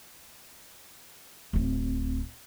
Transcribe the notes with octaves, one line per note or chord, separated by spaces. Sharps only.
D1 C4